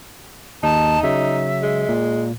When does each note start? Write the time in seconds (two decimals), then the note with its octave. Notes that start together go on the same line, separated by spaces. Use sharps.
0.63 D#2 D#4 A5
1.03 C#3 F#3 E5
1.62 G#3
1.89 A#2